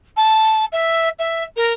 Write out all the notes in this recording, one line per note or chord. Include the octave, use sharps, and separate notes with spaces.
A5
E5
E5
A#4